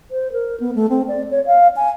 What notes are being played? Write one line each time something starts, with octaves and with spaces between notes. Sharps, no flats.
C5
A#4
B3
A3
C4
D5
C#5
F5
G#5